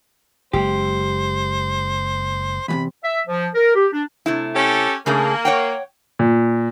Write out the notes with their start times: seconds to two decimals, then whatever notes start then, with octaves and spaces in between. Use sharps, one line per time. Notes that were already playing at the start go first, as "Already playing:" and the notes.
0.53 F#1 G#3 G4 C5
2.68 E2 A2 C3 B5
3.03 E5
3.27 F3
3.54 A#4
3.74 G4
3.92 D4
4.26 C3 A3 E4
4.55 C#4 G4 A4
5.06 C#3 A3 A#3 G#4
5.45 C#5 F#5 G5
6.19 A#2